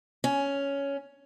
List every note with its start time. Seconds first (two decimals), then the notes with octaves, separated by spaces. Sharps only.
0.24 C#4